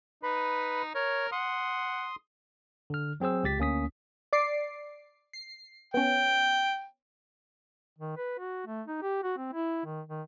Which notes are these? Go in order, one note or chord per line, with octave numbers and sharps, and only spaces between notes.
D#4 B4 B5
A#4 C#5
F#5 C6 D#6
D3 F6
F#3 C4 G#4 C5 E6
C#2 G4 A6 B6
D2 A#3 C#4 D#6 B6
D5 D6 C7
C7
B3 C#4 G5
D#3
B4
F#4
A3
D#4
G4
F#4
C4
E4
D#3
D#3